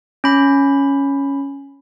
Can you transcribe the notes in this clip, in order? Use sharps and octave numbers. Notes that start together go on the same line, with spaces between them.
C#4 B5